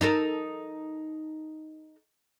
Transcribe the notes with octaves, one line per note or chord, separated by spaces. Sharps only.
D#4 A4 A#4